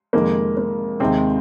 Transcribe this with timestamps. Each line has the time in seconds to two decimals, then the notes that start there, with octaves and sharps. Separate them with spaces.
0.13 F2 C3 D#3 G#3 A#3
0.57 A#3
1.00 D#2 C3 D#3 G#3 C4